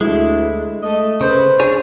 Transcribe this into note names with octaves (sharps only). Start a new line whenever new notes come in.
D2 G#3 E4
A3 D#5
C#3 B4 C5
D4 G#4 C#5